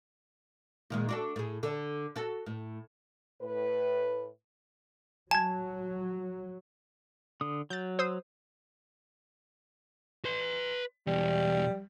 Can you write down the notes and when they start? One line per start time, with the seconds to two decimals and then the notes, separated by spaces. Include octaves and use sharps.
0.90 A#2 D#3 G#3
1.09 D4 F#4 A4
1.36 A2 G#4
1.63 D3 A4
2.16 F#4 A4
2.46 A2
3.42 A2 B4
5.31 F#3 G#5 A5 G#6
7.41 D3 D#6
7.70 F#3 G6 A6
7.99 C5 D#6 E6
10.25 B4 C6
11.07 E2 B2 G3